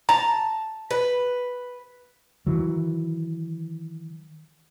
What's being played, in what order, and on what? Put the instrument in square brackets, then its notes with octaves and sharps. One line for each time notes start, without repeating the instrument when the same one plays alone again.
[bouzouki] A5 [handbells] A#5
[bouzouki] B4
[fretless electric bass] D#3 E3 F#3